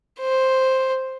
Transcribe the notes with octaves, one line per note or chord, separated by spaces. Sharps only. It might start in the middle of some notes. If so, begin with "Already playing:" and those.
C5